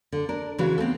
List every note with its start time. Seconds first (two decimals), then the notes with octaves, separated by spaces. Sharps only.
0.12 D3
0.29 D4 A#4
0.58 C#3 E3 G#3 F#4 B4
0.78 B3 C4 D#4 A4